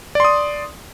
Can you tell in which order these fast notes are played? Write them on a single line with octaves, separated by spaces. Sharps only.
D5 C6 D#6